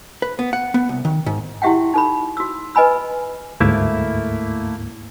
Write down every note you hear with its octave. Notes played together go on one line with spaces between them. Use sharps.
B4
B3
F#5
B3
C2
D#3
G#2
E4 F#4 G4 E5 F#5 G5
D#4 A4 B5
F#4 E6
B4 D#5 G#5 B5 E6
D2 G#2 A3 A#3 E4